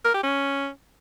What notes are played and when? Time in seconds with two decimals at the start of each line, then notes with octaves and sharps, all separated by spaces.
0.05 A#4
0.14 G4
0.23 C#4